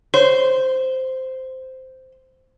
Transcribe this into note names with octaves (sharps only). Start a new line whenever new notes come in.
C5 C#5